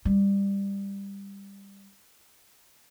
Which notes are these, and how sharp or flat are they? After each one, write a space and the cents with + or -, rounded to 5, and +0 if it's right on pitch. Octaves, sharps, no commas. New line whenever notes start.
G3 +20